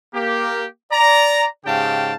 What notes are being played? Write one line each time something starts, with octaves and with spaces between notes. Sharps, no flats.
A#3 G4
D5 A#5
G#2 C#3 G4 F5 G5 A5